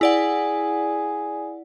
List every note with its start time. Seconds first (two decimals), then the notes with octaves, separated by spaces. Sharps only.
0.01 E4 G#4 D5 F#5